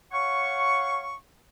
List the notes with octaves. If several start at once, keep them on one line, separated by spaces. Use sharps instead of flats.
C#5 F5 F#5 C#6